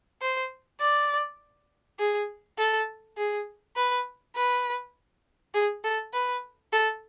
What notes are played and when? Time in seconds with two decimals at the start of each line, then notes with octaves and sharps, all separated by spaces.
0.22 C5
0.81 D5
1.99 G#4
2.58 A4
3.17 G#4
3.76 B4
4.36 B4
5.54 G#4
5.84 A4
6.13 B4
6.73 A4